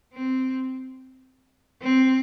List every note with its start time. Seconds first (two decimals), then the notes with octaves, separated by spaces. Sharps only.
0.14 C4
1.82 C4